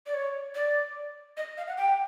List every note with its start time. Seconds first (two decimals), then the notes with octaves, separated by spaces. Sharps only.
0.06 D5
0.14 C#5
0.55 D5
1.37 D#5
1.57 F5
1.67 F#5
1.78 G5